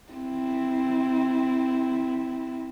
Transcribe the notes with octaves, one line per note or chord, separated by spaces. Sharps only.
C4 E4